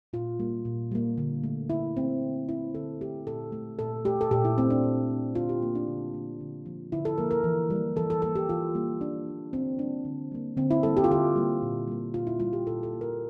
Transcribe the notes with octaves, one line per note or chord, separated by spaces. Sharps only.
A#2 F4
G3 A#3
A#2
G3 A#3
D3
A3
D3 E4
A3 C4
D3
A3 E4
D3 A4
A3 G4
A#2 A4
A3
A#2 A4
A3 G4
A4
A#2 G4
E4
A3 C4
D4
A#2
A3
D3 F4
G4
F3 A#3
D4
D3
F3 A#3
D3
F3 A#3
D3 E4
A4
F3 A#3 A#4
A#4
E3
G3
A#3
E3 A4
A4
G3 A#3 A4
G4
E3 F4
G3 A#3
E3 D4
G3 A#3
D3 C4
G3 A#3 D4
D3
G3 A#3
D3 C4
E4
G3 A#3 A4
G4
F4
D3 G4
G3 A#3
A#2
G3 A#3
A#2 F4
E4
G3 A#3 F4
G4
A#2 A4
A4
G3 A#3
A#4